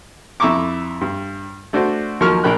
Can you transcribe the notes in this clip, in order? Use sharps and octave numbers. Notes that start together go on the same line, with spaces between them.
F2 E4 E5 A#5 C#6 D6
G2
A3 D4 F#4 C5
D#2 F3 F#3 A#4 C#6 F6
A#1 D4 A#4 G5 B5 F#6